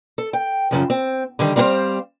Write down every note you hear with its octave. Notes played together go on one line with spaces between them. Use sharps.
A4
G5
F#2 C#3 F3
C4
D3 D#3 G3
G3 C4 G#4 A#4 C5 F5